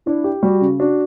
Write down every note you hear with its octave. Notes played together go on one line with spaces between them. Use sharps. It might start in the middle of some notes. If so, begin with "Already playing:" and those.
D4 E4
G4
G3 F#4
C#3
D4 F#4